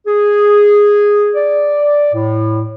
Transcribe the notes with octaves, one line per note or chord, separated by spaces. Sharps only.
G#4
D5
A2